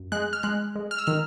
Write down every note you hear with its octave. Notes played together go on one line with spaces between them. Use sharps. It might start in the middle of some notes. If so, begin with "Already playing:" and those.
Already playing: F#2
G#3 F#6
F6
G#3 F#6
G#3
F6
E6
D#3 F6